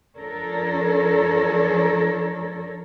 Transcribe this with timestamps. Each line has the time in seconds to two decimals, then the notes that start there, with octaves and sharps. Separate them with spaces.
0.18 F3 D4 A4 A#4 C#5